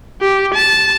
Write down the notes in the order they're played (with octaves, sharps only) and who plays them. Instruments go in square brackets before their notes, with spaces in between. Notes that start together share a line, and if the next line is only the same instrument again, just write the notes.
[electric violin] G4
A5